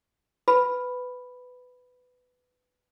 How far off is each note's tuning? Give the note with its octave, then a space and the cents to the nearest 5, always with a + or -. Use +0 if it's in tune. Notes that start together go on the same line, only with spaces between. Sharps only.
B4 +15 B5 +0